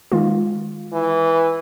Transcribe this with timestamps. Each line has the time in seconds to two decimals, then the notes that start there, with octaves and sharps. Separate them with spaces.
0.12 D#3 G#3 F4
0.93 E3